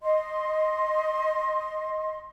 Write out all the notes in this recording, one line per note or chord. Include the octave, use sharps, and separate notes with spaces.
D#5 C6